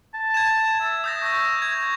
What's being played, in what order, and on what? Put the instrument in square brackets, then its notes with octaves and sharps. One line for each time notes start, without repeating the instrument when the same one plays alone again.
[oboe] A5
[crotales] G#6 E7
[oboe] E5
[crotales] D#6 G6 A#6
C#6 G6 A#6
G#6